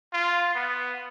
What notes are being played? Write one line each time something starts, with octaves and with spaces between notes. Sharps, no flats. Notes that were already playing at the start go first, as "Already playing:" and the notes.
F4
B3